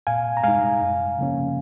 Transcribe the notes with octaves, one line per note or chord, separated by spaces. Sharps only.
A#2 F5 G#5
A#5
G#3 D#4 F5 G#5
F#2
C#3 F3 A#3 C#4